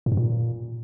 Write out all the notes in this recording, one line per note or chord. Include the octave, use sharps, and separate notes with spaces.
A2
G2
A#2